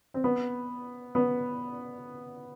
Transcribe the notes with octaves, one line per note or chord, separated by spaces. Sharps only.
C4
B3
B3